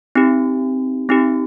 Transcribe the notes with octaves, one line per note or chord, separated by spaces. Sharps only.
C4 D#4 G4
C4 D#4 G4